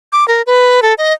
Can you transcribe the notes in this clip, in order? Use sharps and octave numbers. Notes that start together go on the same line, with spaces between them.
D6
A#4
B4
A4
D#5